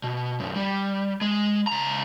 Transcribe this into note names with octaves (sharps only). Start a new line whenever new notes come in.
B2
B1 F#2
G3
G#3
C#2 A#5